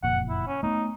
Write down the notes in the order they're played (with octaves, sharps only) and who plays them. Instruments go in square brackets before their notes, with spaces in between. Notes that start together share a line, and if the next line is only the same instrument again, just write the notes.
[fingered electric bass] F#1 F2 A#2 [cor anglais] F#5
[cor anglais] E4
C#4
[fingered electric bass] A3 B3 [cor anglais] D#4